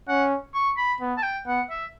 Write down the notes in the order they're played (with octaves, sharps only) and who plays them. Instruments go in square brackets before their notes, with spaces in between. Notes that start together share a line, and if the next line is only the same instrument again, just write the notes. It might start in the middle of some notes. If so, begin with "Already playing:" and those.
[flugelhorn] C#4 [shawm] F#5
[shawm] C#6
B5
[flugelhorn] B3
[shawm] A5
G5
[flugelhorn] B3 [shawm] F#5
[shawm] E5